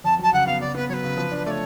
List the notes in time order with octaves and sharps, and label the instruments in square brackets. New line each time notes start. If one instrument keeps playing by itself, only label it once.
[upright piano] F2 [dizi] A5
[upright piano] F#3 [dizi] A5
[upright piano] C#3 [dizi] F#5
[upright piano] B3 [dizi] F5
[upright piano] C#3 [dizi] D5
[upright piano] B3 [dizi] B4
[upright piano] F#3 [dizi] C#5
[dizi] B4
[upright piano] C#3
F3
D4
[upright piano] A3 [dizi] C#5 D5